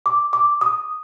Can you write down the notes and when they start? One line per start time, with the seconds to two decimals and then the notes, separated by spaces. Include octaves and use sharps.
0.06 D6
0.33 D6
0.61 D#6